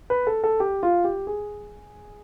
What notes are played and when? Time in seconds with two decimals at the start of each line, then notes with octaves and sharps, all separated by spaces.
0.10 B4
0.27 A4
0.44 A4
0.60 G4
0.83 F4
1.04 G4
1.27 G#4